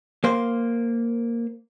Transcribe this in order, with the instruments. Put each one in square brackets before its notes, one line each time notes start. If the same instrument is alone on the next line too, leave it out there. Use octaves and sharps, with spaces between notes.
[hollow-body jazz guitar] A#3 C5